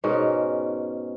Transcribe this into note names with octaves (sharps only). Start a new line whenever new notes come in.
G#2 B2 C#4 A#4